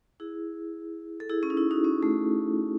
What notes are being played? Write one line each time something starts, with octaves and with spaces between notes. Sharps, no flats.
E4 G#4
A4
E4 G#4
C#4
D#4
E4
D#4 F#4
C#4
A3